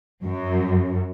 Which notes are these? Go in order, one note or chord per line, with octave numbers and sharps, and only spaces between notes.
F#2